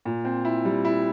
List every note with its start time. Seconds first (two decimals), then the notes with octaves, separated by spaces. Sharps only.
0.05 A#2
0.25 C4
0.45 E4
0.65 G3
0.85 E4